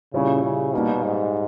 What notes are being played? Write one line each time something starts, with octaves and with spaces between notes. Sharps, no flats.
A#2 C#3 G3 C#4 E4
C#3
B2 G3 A#3 D#4
G#2